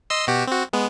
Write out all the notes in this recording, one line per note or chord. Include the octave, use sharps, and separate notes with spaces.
D#5 C6 E6
B2 F#4 G4
C4 F#4
G#3 B3